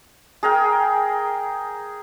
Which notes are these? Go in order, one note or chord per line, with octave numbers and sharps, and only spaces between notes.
G#4 A#4 G5